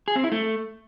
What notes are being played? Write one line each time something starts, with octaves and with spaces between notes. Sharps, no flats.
G#4
C4
E4
A3